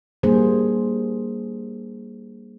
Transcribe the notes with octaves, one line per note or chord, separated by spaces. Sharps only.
G3 A#3 D4 G#4 C5